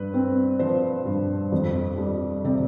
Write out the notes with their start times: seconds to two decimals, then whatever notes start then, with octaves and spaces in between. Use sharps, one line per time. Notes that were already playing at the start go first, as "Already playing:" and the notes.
Already playing: G2 B4
0.14 C4
0.59 F3 C5
1.06 G2
1.52 F2
1.98 G3
2.44 C3 D5